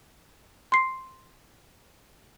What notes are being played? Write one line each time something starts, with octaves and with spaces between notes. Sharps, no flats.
C6 C7